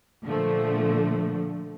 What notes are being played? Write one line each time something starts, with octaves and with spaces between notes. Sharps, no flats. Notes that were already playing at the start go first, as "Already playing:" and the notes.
A#2 D3 F3 A3